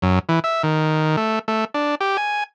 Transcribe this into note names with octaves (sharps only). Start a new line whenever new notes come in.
F#2
E3
E5
D#3
A3
A3
D4
G4
G#5